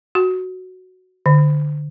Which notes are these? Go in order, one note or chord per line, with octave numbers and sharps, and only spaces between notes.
F#4
D3